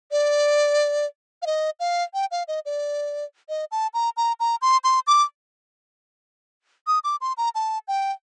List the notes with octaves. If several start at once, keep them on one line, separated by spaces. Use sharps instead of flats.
D5
F5
D#5
F5
G5
F5
D#5
D5
D#5
A5
A#5
A#5
A#5
C6
C6
D6
D#6
D6
C6
A#5
A5
G5